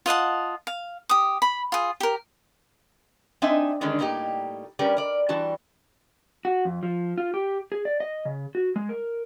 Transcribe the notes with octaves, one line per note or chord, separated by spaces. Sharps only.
F4 D#5 F#5 A5
F5
G4 D#6
B5
F4 G#4
G4 A#4
C4 D4 D#4 D#5 E5 G#5
D3 D#3 G3 G#3 C#4 D4
A2 G3 A#3 D#4 G4
G3 C#4 G4 A#4 B4 D5
A#4 D5
E3 G3 F#4 A5
F#4
F2
F3
F4
G4
G#4
D5
D#5
C#3
F#4
G#3
A#4